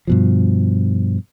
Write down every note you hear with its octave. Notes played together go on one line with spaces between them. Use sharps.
G2 B2 F3